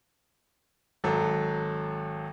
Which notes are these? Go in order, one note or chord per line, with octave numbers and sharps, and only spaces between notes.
G#1 F#3 A4